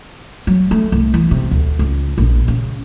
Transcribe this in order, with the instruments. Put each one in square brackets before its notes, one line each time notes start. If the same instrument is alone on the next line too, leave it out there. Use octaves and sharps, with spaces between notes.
[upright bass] F#3
A3
C2
E3
C3
D2
C#2
A#1
C#3